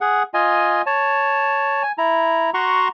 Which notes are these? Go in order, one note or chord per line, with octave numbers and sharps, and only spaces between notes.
G#4 F#5
F4 D#5 G#5
C#5 A5
G#5
E4 A#5
F#4 F#5 A#5 C6 C#6